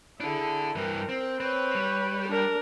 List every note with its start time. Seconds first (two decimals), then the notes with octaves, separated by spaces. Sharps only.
0.20 D4 E4 G#4 A4
0.76 G2 E3 A#4
1.09 C4
1.40 C4 B4 C#5
1.75 G3
2.28 D4 A#4